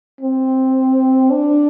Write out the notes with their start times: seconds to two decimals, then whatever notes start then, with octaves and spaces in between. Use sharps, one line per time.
0.21 C4
1.31 D4